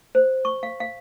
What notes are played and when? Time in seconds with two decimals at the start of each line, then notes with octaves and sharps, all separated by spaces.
0.15 C5
0.45 C#6
0.63 F5
0.80 F5